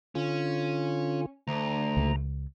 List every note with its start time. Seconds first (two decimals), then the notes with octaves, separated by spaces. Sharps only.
0.15 D3 C#4 F4
1.48 D2 A#5
1.97 C#2